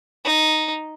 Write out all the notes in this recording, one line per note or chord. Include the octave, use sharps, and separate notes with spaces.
D#4